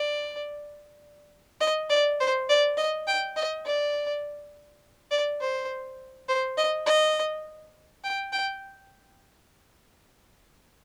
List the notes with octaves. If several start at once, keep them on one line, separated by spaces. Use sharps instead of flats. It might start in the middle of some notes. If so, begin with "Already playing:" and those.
Already playing: D5
D#5
D5
C5
D5
D#5
G5
D#5
D5
D5
C5
C5
D#5
D#5
G5
G5